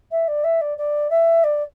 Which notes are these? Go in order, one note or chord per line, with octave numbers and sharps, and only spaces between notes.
E5
D5
E5
D5
D5
E5
D5